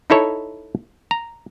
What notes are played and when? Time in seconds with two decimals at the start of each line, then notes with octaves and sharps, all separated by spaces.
0.10 D#4 E4 A4 C#5
1.11 A#5